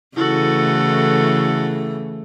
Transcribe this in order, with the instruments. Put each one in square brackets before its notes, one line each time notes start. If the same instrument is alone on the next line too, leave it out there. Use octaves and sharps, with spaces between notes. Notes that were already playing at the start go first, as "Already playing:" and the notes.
[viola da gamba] C#3 E3 A3 [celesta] E4 F#7 [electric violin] F#4 A4